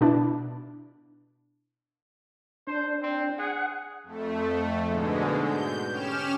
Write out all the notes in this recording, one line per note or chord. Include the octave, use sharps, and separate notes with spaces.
B2 D4 E4
D4 C5
C4
G#4 F#5
F2 A3
G#2 B2 D3 G#3
G6
C#4 G4 F6 E7